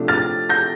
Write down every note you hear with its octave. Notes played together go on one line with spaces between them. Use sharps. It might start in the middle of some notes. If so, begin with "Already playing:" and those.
Already playing: C3 F3 A3 D4
F6 A6
G6 A#6